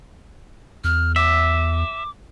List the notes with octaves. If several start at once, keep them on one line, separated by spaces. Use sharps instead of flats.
E2 F6
E5 D6